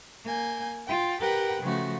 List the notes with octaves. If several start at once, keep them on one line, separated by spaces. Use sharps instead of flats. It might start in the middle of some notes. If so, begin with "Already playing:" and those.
A#3 G#5 G6
F4 G5
G4 A#4 B4 F#5 G5
C#3 F3 A3 F#4